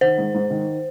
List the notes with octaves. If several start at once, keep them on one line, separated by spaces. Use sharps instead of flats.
D#3 C5
G#2
G#2
D#3